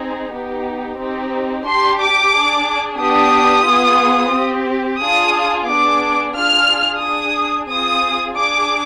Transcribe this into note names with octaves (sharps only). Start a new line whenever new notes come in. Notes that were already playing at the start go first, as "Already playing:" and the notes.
Already playing: C4 D#4 G#4
B3 D#4 G4
C4 D#4 G4
D4 G4 C6
D6
D4 G#4
B3 D4 G4 D#6
B3 F4 G#4
C4 G4
D4 F4 G#4 D#6
B3 D4 G#4 D6
D4 F4 G#4 F6
D4 G#4 D#6
C4 F4 G#4 D#6
D4 G#4 D6